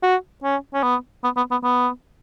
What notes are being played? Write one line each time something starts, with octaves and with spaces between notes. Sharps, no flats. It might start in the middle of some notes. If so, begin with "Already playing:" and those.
F#4
C#4
C#4
B3
B3
B3
B3
B3